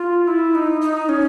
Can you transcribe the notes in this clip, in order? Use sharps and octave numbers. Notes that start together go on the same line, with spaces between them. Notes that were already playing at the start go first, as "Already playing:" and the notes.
Already playing: F4
E4
D#4
D#4
C#4